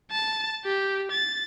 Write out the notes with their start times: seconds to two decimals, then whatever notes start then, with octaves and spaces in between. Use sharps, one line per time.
0.11 A5
0.65 G4
1.12 A6